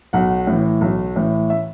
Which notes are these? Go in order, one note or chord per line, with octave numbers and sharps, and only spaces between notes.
B1 F#5
A2 E3
B1
A2 E3
E5